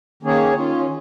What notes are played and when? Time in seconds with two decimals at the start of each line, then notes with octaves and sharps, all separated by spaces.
0.23 D#3 A#3 C#4 G#4 C#5
0.54 D#3 C#4 F4